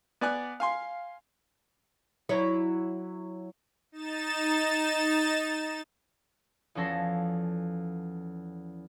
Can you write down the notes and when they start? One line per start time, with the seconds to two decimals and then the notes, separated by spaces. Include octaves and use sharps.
0.21 B3 D5 G#5 F#6
0.60 F5 G#5 C6
2.29 F#3 E4 C#5
3.92 D#4 A6 E7
6.75 E2 F3 C#4 A4 A#6 C7